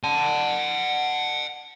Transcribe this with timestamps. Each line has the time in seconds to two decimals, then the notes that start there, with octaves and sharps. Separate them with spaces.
0.04 F#5 A5